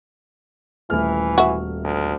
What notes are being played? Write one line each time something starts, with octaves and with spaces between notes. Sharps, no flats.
D#1 E3 A3 F6
F#4 E5
D2